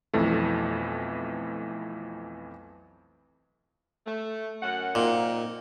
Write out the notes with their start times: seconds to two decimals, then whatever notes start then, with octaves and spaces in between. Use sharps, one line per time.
0.13 B1 F2 E3 A3
4.06 A3
4.61 F#2 F#5
4.95 A#2 A#3 C4 D#4